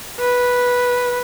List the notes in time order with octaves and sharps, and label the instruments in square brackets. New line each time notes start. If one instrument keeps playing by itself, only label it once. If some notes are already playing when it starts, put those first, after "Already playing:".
[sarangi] B4